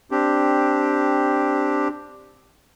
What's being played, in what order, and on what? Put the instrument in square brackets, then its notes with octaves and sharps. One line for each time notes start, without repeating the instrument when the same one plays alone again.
[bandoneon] C4 D4 G4